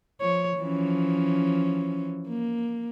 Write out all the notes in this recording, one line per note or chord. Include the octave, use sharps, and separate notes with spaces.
F3 C#5
E3 F3 C#4
A#3